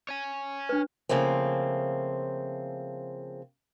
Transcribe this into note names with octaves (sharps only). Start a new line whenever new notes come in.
C#5 G#5
D4 B4
C#3 F3 A3 A#3 C4